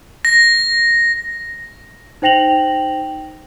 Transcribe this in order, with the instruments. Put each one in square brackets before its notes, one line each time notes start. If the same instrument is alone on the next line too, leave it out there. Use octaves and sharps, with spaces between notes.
[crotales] A#6
[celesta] D#4 C5 G5 A#6 F7 F#7